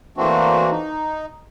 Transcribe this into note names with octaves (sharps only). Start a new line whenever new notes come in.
E3 A3 A#3 C4 D4 F#4
D#4